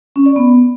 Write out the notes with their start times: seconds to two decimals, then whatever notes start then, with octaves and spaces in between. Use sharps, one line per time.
0.16 C#4
0.26 D5
0.36 B3